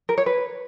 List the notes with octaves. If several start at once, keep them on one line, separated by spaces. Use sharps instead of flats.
A#4
C#5
B4